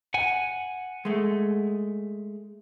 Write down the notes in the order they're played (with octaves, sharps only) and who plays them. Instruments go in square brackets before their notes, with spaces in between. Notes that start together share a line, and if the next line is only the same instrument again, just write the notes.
[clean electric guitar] F#5 G#5
[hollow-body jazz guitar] G#3 A3